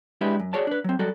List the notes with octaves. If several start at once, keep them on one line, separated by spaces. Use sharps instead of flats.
G#3 D4 E4 G4 B4
F#2
F#4 G#4 C#5 D5 A5
D4 B4
F#3 C4
F#3 G3 F#4 A4